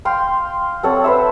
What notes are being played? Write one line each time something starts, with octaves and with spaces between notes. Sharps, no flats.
F5 G5 C6
C4 A4 C#5 F#5
B4 C5 E5